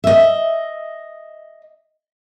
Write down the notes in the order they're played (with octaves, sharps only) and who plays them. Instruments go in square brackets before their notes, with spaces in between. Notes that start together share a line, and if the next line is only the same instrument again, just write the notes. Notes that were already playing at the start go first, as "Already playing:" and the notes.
[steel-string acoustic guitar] D#5 E5